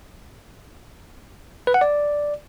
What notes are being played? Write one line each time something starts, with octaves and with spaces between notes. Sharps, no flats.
B4
F#5
D5